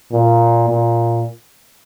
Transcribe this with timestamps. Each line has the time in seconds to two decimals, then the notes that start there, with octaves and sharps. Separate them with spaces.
0.12 A#2
0.69 A#2